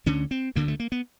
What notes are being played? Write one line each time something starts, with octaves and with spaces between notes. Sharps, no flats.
D2 D3 C#4
C4
D2 D3 A#3
A3
A#3
B3